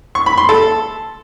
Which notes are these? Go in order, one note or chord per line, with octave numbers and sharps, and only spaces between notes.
C#6
B5
C6
A4